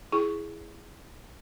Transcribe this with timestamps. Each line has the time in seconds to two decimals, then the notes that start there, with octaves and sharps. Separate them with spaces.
0.12 E4 G#4 C#6